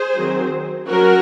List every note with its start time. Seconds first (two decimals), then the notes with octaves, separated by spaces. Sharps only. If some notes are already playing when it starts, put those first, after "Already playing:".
Already playing: G#4 C5
0.17 D#3 F#3 C4
0.87 F#3 C#4 F#4 A#4